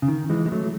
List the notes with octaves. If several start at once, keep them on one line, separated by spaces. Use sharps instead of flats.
C#3
D#3
E3 G#3
G#3
F#3 A3